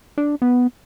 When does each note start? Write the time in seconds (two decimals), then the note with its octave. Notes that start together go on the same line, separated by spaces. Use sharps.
0.18 D4
0.42 B3